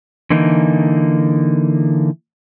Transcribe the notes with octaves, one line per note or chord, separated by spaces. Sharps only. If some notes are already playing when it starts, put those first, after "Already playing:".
D3 E3 A#3 D#4